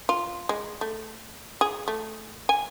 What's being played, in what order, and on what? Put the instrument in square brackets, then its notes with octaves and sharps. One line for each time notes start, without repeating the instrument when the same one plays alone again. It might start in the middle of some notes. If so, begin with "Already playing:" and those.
[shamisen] F4
G#3
A3
G#4
A3
G#5